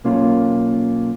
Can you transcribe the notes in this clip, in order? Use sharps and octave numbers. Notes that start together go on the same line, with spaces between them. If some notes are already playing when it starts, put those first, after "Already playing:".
B1 A#3 C#4 F4